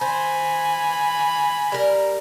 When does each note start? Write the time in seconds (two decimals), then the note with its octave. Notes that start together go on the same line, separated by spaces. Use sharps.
0.01 C5 G#5 B5
1.72 G3 A#4